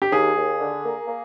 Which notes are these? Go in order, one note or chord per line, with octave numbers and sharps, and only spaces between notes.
G4
D#2 G#4
D#2
D3
A#3
A#3